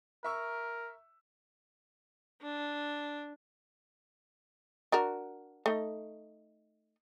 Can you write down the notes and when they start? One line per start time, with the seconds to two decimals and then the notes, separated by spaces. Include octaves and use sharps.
0.24 A#4 E5 C#6 E6
2.42 D4
4.92 D4 F#4 A#4
5.66 A3 D#4